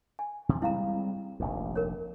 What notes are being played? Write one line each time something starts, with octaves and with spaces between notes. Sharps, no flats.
G#5
C3 F3
G3 G#3 C4 E4 F5 A#5
F1 A#1 D#2
A#4 C#5